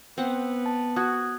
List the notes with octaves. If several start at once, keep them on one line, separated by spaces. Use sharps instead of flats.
B3 C4 F#5
A5
F#4 D#6 F#6 G#6